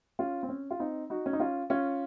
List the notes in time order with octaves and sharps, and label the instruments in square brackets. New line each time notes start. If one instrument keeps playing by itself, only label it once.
[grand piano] C#4 F4
C4
C#4
F4
C4 D#4
D#4 F#4
C#4
D#4
C#4 F4
C#4 F4